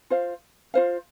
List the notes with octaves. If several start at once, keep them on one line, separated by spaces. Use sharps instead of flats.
F4 C5 F5
F4 C5 F5